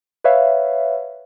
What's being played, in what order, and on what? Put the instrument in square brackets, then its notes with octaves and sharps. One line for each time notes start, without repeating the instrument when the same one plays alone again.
[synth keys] B4 C#5 E5 F5